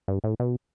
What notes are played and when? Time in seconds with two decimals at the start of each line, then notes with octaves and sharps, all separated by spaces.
0.08 G2
0.24 A2
0.40 B2